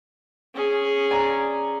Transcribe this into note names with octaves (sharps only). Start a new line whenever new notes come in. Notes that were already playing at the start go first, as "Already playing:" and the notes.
C#4 G#4
D5 G#5 A#5